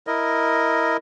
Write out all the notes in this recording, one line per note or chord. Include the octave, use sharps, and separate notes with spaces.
E4 A#4 D#5